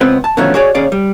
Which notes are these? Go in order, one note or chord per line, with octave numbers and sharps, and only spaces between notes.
C#2 B3 C4 B4
A5
B2 D3 D#3 F3 A3 C#4
F#4 G#4 C#5 D5
D#2 C#4 G#4 D5 F5
G3